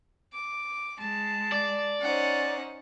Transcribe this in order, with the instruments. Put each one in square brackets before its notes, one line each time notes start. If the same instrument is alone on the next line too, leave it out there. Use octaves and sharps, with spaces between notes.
[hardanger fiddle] D6
[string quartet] G#3 [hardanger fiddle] A5
[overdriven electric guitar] D5
[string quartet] C#4 D#4 C5 [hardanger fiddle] F#5